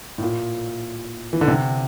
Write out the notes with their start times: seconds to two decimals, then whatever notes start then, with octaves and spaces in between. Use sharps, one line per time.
0.18 A2
0.22 A#2
1.33 E3
1.41 D3
1.48 C3